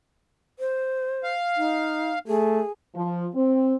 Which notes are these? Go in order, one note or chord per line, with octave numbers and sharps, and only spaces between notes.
C5
F5
D#4
A3 G#4
F3
C4